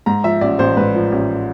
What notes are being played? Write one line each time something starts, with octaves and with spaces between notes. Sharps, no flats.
G#2 A#5
F3 E5
A1 D5
A1 C5
G#2 B4
F3
A1